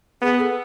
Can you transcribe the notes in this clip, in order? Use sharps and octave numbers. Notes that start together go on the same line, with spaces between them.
B3 G#4
A4